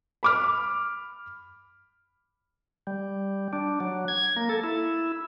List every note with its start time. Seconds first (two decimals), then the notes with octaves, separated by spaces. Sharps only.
0.23 B5 D6 F6
2.87 G3
3.53 D4
3.80 F#3
4.08 G#6
4.36 A#3
4.49 A4
4.64 E4